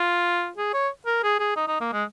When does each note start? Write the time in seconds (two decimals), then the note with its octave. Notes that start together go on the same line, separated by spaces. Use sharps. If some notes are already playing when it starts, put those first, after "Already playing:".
Already playing: F4
0.57 G#4
0.74 C#5
1.06 A#4
1.23 G#4
1.39 G#4
1.56 D#4
1.68 D#4
1.81 A#3
1.93 G#3